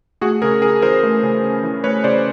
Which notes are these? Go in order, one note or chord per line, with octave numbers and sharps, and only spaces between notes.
A3 F#4 G#4
C#3 G#4 A#4
C#4 G#4 A#4
E3 A#4 C5
A3
C#3
C#4
E3
A3 B4 C#5
C#3 C5 D5